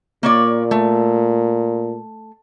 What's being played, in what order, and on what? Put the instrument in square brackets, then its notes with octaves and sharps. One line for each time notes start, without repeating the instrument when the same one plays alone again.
[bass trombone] A#2 [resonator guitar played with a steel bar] A#3 C#5 D5
[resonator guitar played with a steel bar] A3